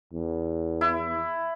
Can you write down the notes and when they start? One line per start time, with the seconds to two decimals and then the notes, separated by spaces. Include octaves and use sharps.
0.14 E2
0.81 E4